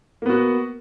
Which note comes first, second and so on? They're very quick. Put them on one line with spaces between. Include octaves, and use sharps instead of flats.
A#3 B3 F#4